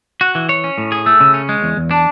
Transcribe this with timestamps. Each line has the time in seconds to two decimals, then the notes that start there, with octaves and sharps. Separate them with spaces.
0.21 F#4 F#6
0.35 E3
0.49 C#5
0.64 C#4
0.78 A2
0.92 G#4
1.06 A3 E6
1.20 C#3
1.34 C#4
1.49 G#3
1.63 E2
1.77 E2
1.91 D4 A5